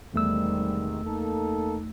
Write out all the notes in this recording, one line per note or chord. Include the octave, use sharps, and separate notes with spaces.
E2 G#2 C3 D#3 G3 A3 E6
A#3 D#4 A4